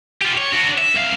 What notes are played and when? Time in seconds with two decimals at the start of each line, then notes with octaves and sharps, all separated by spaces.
0.21 F4 G4
0.37 C#5
0.52 D4 F#4
0.78 E5
0.94 C2 F5